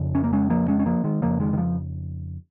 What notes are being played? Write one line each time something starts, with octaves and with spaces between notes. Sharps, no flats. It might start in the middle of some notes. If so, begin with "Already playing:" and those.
Already playing: F2 C#3
C#4
A#3
G#3 C#4
F3 A#3
G#3 C#4
C#4
F3 A#3
D#3 G#3
F2 C#3 F3 A#3
D#3 G#3
D#3
F3